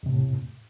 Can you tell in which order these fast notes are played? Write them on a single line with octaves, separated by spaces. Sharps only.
E2 C3 A2